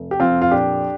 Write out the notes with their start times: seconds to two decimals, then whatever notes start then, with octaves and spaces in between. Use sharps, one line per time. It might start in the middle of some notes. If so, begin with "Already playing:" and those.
Already playing: F1
0.11 G4
0.20 F2 C4 F4
0.42 F4
0.51 A#2 D4 G4